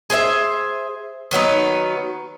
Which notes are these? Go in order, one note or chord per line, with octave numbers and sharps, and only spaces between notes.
G#4 C5 D#5 E5
D#3 F#3 B3 D#4